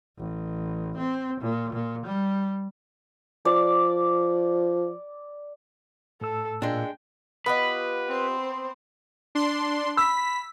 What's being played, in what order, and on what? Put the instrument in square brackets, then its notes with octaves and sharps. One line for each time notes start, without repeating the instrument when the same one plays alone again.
[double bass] A1
C4
A#2
A#2
G3
[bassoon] F3 [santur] D5
[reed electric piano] A2 E6 [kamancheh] A4
[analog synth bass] A#2 [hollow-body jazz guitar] G#3 D4 [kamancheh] G5
[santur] B3 [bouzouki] F4 G4 D#5 [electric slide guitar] B4
[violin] C4 C5
[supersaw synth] D4 C6
[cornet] B5 [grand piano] E6 [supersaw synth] B6